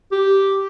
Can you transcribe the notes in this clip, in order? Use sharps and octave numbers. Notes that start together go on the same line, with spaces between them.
G4